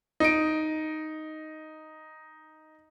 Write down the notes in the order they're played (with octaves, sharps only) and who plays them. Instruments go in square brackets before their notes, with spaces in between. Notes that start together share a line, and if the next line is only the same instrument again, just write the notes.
[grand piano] D#4 D7